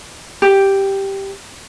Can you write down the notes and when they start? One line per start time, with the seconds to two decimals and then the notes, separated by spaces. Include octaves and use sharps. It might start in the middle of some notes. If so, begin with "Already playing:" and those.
0.42 G4